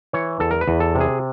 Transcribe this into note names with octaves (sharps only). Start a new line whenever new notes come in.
E3 C#5
E2 A4
A#4
B4
E2
A4
C3
G#4